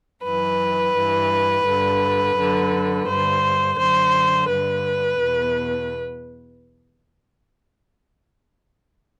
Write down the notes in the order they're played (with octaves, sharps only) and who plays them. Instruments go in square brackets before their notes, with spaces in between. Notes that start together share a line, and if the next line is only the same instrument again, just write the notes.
[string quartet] F#2 E3 B4
G2 E3
G2 D3
F#2 D3
G2 D3 C5
F#2 D3 C5
G2 D3 B4
E2 B2